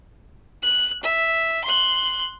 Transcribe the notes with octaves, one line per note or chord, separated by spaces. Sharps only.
F#6
E5
C6 F#6